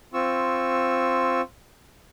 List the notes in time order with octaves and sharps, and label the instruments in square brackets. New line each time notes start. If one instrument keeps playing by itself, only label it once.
[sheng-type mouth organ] C4 F4 C#6 E6